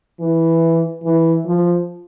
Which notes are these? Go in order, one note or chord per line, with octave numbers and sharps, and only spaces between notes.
E3
E3
F3